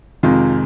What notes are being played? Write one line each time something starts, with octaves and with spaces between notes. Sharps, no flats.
F2 C3 D#3 G#3 F4